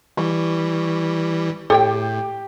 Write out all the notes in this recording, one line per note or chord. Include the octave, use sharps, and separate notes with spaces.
E3 G3 C#6
A2 G4 A4 C#5 G5